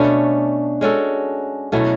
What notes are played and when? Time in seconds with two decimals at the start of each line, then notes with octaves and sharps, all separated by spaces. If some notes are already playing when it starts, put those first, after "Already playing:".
Already playing: B2 A3 C#4 D4
0.81 G#3 C#4 F#4 A4
1.72 B2 F#3 A3 C#4 E4